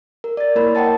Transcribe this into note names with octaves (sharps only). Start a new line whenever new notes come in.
A#4
D5 A6
A#3 E4 A#4 C#5 B5
D#5 F#5 G5 A5 A6